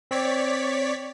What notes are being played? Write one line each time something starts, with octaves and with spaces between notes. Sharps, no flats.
C4 C#5 D5 B6